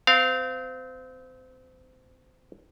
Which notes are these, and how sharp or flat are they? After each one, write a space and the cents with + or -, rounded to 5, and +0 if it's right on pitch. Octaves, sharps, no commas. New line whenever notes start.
C4 -30 F5 +0